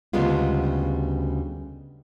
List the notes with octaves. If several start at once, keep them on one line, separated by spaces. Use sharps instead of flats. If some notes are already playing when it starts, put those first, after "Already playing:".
D2 C#3 G3 G#3 B3 F4